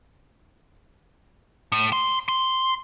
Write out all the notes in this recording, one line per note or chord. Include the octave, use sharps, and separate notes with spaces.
A2
C6
C6